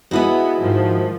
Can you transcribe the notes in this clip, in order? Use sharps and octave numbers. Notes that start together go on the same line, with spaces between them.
G#3 B3 E4 F#4
G#2 D#3 F3